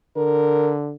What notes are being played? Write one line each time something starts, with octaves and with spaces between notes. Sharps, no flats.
D3 A#4